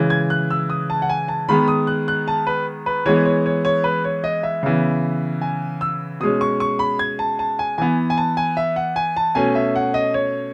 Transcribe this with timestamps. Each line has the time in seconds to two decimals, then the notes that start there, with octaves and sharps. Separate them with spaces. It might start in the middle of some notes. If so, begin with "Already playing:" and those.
Already playing: C#3 E3 G#3
0.10 G#6
0.30 F#6
0.50 E6
0.70 D#6
0.90 A5
1.02 F#5
1.09 G#5
1.28 A5
1.49 D#3 G#3 B3 B5
1.68 D#6
1.87 F#6
2.08 F#6
2.28 A5
2.47 B4
2.86 B4
3.06 E3 G#3 B3 C#5
3.25 C#5
3.46 C#5
3.65 C#5
3.84 B4
4.04 C#5
4.24 D#5
4.43 E5
4.63 C#3 E3 B3
5.41 G#5
5.81 E6
6.20 B2 G#3 C#4 D#6
6.41 C#6
6.60 C#6
6.79 B5
6.99 G#6
7.19 A5
7.39 A5
7.59 G#5
7.78 E3 B3 G#5
8.10 G#5
8.18 A5
8.37 G#5
8.57 E5
8.76 F#5
8.96 G#5
9.16 A5
9.35 B2 A3 C#4 G#5
9.55 E5
9.75 F#5
9.94 D#5
10.14 C#5